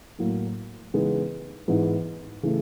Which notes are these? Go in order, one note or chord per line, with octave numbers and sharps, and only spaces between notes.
A2 F#3 A#3
C#3 E3 G#3 B3 D#4
G#2 E3 G#3 B3
C#3 E3 A3